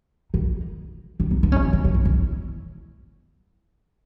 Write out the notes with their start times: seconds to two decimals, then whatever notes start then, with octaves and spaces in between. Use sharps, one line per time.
0.34 D#4
1.20 D4
1.31 D#4
1.43 D4
1.52 C#4
1.63 E4
1.73 D#4
1.84 D4
1.94 D#4
2.05 E4